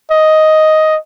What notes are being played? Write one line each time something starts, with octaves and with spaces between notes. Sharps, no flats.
D#5